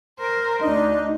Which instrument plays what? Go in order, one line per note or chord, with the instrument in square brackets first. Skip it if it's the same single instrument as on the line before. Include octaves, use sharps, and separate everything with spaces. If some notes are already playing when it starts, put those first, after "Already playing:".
[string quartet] A#4 C5
[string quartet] D2 [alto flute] D4 [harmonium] D#4 D#5